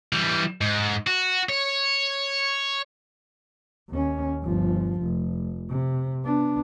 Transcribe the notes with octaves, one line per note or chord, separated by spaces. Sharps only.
E3 G3
G#2
F#4
C#5
D#2 C#4
G1 F3
F1
C3
B3 D4